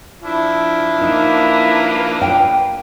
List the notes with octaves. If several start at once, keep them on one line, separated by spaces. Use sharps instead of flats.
F3 D4 E4
A#3 D#4 B4
G5